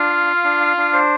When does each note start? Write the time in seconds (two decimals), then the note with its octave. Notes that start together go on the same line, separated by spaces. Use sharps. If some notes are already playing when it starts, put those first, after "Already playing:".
Already playing: D4 F4
0.10 F5
0.27 F5
0.44 D4
0.60 F5
0.77 D4
0.93 C5